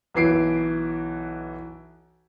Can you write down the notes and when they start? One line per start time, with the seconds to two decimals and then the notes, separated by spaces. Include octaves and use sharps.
0.14 B1 E3 C7 D7